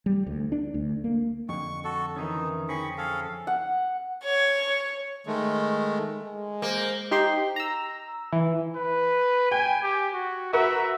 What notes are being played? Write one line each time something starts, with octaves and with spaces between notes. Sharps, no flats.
G3
D2
D4
D2
A#3
F2 D3 C#6
F#4 A4
D#3 E3 C#4 D#4
C4 C#4 G#4 B5 C#6
G#4 A4 F5
F#5
C#5
D#3 G#3 A3
G#3
A#3 C5
D#4 G4 C5 C6
A#5 E6
E3
B4
G5 G#5
G4
F#4
F#4 A#4 B4 E5